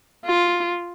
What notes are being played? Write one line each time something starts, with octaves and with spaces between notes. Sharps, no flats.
F4